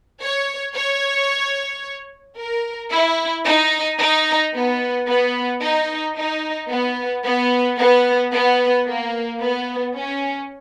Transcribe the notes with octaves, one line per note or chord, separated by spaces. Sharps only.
C#5
C#5
A#4
E4
D#4
D#4
B3
B3
D#4
D#4
B3
B3
B3
B3
A#3
B3
C#4